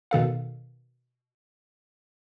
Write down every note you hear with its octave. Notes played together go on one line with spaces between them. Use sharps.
B2 D#3 A4 F5